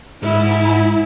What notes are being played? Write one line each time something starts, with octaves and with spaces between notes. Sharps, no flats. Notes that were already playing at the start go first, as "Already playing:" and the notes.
G#2 E4